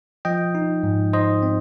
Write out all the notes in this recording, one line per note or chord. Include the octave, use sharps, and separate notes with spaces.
F3 D#5 G5
D#4
G#2
D#4 C5 D#5
C4